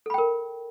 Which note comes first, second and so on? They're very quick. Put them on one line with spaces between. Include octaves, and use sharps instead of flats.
A4 B5 G5 A#4